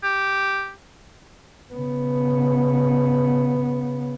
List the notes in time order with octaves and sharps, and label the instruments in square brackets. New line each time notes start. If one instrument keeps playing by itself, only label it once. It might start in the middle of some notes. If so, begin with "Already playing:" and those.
[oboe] G4
[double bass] C#3 B3